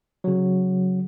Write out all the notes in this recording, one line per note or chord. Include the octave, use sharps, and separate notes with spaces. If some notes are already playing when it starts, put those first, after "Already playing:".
C#3 F#3